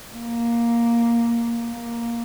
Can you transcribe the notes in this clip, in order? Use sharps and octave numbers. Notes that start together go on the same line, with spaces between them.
A#3
A#3